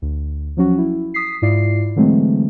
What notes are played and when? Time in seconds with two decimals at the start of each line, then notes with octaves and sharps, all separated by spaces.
0.02 D2
0.57 F3 F#3 C#4 F#4
0.78 E4
1.14 D#6 B6 C7
1.42 G#2 E4 F4 D5 C7
1.96 D3 E3 F#3 G#3 A3 C4